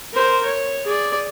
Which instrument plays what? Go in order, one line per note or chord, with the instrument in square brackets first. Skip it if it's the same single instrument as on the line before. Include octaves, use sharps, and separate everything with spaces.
[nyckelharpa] A#4 C5
C#5
G#4 D5